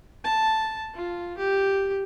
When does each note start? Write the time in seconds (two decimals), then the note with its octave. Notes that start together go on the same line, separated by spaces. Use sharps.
0.24 A5
0.94 F4
1.37 G4